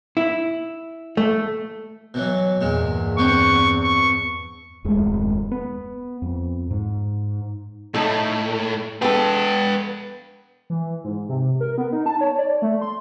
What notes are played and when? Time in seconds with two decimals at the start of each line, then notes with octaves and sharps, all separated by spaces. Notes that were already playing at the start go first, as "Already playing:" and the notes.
0.17 E4
1.17 A3
2.14 B2 E3 F#3
2.61 E2 G2 A#2 G#3
3.18 B3 C4 D4 C#6
3.83 C#6
4.84 D#1 F#2 G#3 A3
5.51 B3
6.22 F2
6.71 G#2
7.94 A2 A3 D#4 A4
9.02 B3 A4 B4 G5
10.70 E3
11.04 G#2
11.29 C3
11.60 A#4
11.78 B3
11.92 D#4
12.06 A5
12.21 C#5
12.38 D5
12.62 A3
12.81 C6